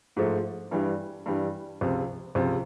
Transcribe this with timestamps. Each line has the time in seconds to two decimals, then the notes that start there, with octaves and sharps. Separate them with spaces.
0.17 G#2 F3 A3
0.71 G2 E3 G3
1.26 G2 E3 G3
1.81 C#2 C3 F3
2.35 C#2 C3 F3